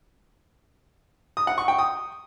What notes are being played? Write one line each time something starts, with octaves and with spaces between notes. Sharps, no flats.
D#6
F#5
C#6
G5
D#6